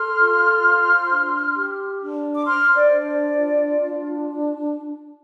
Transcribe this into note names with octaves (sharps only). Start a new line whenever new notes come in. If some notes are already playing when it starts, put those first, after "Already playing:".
Already playing: A4 C6 F6
F4
C5
D4
G4
D4
D6
C5 C6 F6
D5
D4
D5
F4
D4